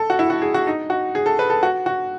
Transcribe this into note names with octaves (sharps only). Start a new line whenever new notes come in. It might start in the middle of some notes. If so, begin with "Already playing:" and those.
Already playing: A4
F#4
E4
F#4
G#4
F#4
D#4
F#4
G#4
A4
B4
A4
F#4
F#4